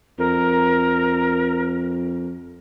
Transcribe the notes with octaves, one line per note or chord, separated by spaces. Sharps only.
F2 A#4